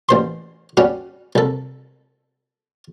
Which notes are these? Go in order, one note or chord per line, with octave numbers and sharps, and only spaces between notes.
A1 C5 C6
G3 C#4 F#4
C2 A4